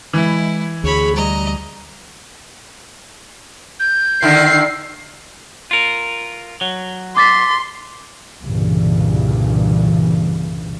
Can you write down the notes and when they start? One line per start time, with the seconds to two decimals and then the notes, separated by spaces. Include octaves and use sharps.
0.13 E3 G#3 E4
0.84 D2 G#4 C#5 B5
1.15 G3 D#5 A#5
3.80 G6
4.22 D3 D#3 E4 C7
5.71 F4 A#4
6.61 F#3
7.17 C6 D6 A6 B6
8.41 C2 G2 A#2 C#3 E3